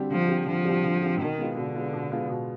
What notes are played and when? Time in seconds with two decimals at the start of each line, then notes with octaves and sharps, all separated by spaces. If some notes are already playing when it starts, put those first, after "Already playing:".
Already playing: D3 G3 C4 G4
0.10 D3 F3
0.29 G3 C4 G4
0.46 D3 F3
0.65 G3 C4 G4
0.84 D3
1.01 G3 C4 G4
1.19 B2 D#3
1.39 G#3 B3 F4
1.57 B2 D3
1.75 G#3 B3 F4
1.93 B2
2.12 G#3 B3 F4
2.29 B2